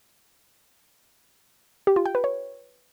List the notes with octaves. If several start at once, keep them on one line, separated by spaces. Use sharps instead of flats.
G4
F4
G5
B4
C#5